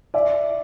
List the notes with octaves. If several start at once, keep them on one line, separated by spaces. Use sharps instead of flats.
D5 E5